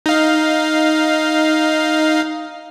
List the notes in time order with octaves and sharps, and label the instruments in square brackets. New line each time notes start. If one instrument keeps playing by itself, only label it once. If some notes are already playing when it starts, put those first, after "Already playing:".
[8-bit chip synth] D#4 F5